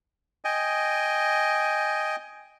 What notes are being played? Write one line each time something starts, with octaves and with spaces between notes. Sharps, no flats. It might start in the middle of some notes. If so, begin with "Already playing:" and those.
D#5 G5 G#5